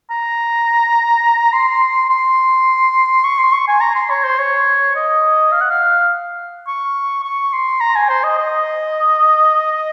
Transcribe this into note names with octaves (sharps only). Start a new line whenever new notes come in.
A#5
C6
C6
C#6
C6
C#6
G#5
A#5
C6
C#5
C5
C#5
D#5
F5
F#5
F5
C#6
C#6
C6
A#5
G#5
C5
D#5
D#5